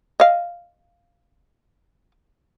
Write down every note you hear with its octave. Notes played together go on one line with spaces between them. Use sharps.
D#5 F5